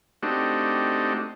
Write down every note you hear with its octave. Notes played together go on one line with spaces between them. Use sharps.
A3 C4 D4 D#4 F#4 G4